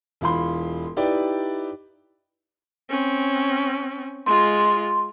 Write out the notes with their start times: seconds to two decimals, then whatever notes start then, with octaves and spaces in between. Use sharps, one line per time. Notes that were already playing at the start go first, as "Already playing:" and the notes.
0.21 E1 E3 F4 B5 C6
0.97 D#4 E4 G4 B4 D5 G5
2.89 C4 C#4
4.26 G#3 F4 C6